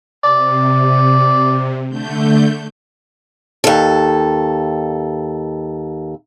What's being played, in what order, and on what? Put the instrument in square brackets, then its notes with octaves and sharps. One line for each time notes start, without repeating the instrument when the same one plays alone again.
[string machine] C3 [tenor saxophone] D5
[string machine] D3 A3 G6
[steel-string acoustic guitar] D#2 A4